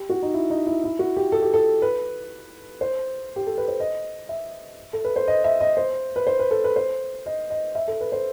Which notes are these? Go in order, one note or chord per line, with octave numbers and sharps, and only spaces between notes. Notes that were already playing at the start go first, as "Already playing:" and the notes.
Already playing: G4
F#4
D#4
E4
D#4
E4
E4
F#4
G4
A4
G4
A4
B4
C5
G4
A4
B4
C5
D#5
E5
A4
B4
C5
D#5
E5
D#5
C5
B4
C5
B4
A4
B4
C5
D#5
D#5
E5
A4
B4
C5